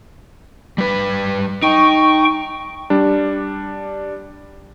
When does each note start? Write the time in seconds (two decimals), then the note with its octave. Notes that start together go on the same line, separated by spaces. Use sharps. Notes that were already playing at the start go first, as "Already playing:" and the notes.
0.78 G3 B4
1.62 D#4 G5 C#6
2.90 G3 D4